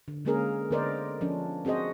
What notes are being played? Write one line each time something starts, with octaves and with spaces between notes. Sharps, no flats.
D3
D3 G#3 A#3 C#4 G#4 A#4
D3 B3 A#4 C5 D5 D#5
F3 C#4 D4
C4 F#4 G#4 C5 D#5